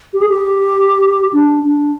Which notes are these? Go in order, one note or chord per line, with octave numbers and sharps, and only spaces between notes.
G4
G#4
G4
D4
D4